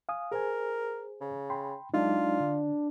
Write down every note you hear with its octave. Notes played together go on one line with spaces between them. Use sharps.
F5 G#5 D#6
G#4 A#4 C5 G#5
C#3
G5 B5 C6
F#3 G#3 D4 D#4 F4
D3